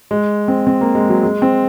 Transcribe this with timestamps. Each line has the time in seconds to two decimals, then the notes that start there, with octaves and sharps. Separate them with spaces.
0.11 G#3
0.48 C4
0.67 C4
0.81 A#3
0.95 G#3
1.09 F#3
1.23 G#3
1.42 C4